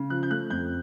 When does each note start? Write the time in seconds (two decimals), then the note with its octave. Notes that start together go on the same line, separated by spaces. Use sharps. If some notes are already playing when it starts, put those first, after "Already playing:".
Already playing: C#3
0.10 F3 F#6
0.23 G6
0.30 A3 F#6
0.50 F2 G6